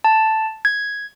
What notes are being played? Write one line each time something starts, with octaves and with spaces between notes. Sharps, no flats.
A5
G#6